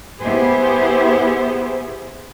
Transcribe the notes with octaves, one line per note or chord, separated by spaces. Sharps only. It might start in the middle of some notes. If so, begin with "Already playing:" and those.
B3 E4 G4 G#4 C5